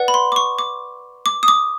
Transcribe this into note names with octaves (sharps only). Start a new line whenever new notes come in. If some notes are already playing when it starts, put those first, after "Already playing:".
Already playing: B4 D5 F#5
B5
C6
D6
C#6
D6
D6
D#6
D6